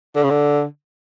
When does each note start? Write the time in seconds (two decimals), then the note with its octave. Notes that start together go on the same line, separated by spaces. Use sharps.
0.16 D3
0.23 C#3
0.30 D3